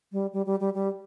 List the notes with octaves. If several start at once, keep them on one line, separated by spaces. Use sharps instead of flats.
G3
G3
G3
G3
G3